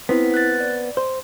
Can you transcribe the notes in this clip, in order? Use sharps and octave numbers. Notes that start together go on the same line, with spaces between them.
B3 C4 E4 B6
F#6 A6
D5
C5